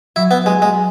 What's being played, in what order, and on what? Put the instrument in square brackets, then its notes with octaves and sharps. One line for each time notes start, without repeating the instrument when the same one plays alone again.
[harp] F#3 [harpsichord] E4
[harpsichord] B3
[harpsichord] G#3 [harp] G#4
[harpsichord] G#3